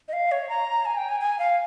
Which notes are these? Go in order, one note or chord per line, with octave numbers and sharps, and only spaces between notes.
D#5
F5
C#5
A#5
G#5
G5
G#5
G#5
F5